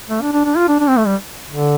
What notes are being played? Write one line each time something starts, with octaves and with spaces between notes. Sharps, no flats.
A3
D4
D4
D4
F4
D4
D4
C4
A3
G3
D3